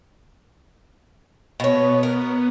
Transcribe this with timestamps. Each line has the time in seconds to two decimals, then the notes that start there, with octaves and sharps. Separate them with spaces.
1.60 B2 B3 C#5
2.03 A#4